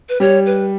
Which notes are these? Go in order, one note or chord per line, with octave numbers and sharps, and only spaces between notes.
B4
G3 C#5
B4